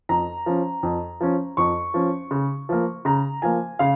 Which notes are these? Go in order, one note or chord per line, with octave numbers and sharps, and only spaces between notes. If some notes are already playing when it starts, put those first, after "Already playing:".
F2 A#5
F3 C#4
F2
F3 C#4
F2 C#6
F3 C#4
C#3
F3 A#3
C#3 A#5
F3 A#3 G#5
C#3 F5